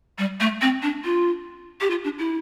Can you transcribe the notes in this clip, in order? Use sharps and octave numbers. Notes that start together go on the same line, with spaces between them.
G3
A3
C4
D4
F4
G4
F4
D4
E4